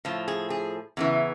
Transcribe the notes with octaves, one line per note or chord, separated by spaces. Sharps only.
A2 F3
G#4
G#4
E2 C#3 E3